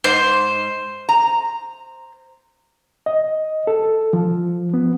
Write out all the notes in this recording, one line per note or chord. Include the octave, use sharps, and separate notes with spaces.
G#2 C5
A#5
D#5
A4
F3
B3